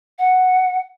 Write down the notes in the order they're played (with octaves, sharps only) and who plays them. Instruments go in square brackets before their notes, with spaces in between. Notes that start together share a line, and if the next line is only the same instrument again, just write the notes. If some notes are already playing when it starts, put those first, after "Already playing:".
[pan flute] F#5